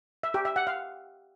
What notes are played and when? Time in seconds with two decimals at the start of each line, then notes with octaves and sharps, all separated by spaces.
0.23 E5
0.34 G4
0.45 E5
0.56 F#5
0.67 F5